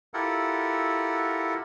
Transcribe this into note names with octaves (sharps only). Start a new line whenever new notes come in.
E4 F4 G4 A4 A#4 F#5